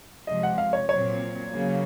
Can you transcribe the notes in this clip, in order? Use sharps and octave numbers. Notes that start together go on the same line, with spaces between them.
C3 F3 G#3 D#5
F#5
F5
C#5
A#2 F#3 C4 C#5
C#3 F#3 A#3